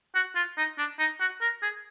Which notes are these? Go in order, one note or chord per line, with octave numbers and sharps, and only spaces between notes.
F#4
F4
D#4
D4
D#4
F#4
A#4
G#4